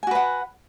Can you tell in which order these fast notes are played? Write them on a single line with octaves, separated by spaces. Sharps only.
G#5 F#4 B4 F#5